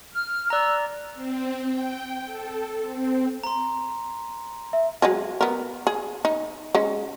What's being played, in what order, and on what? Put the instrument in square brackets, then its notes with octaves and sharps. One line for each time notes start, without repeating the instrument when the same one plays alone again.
[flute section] F6
[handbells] D5 A#5 [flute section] E6 F#6
[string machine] C4
G5
A4
C4
[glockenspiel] A#5 C6
[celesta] E5
[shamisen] F#3 G#3 G#4
B3 A#4
G#4
D#4
G#3 C#4